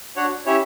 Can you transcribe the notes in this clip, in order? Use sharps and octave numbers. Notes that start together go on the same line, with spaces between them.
D4 F#4 C#5 F#5
C#4 E4 G4 C#5 E5